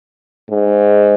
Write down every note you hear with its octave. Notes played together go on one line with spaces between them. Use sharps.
G#2